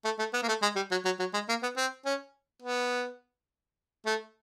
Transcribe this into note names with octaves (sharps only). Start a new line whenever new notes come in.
A3
A3
B3
A#3
A3
G#3
G3
F#3
F#3
F#3
G#3
A#3
B3
C4
C#4
B3
A3